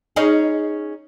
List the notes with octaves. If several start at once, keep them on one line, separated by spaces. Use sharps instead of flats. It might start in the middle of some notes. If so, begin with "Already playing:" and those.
C#4 D#4 G#4